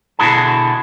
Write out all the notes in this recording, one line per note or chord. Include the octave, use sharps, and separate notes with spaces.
B2 D3 E4 F#4 G#4 A5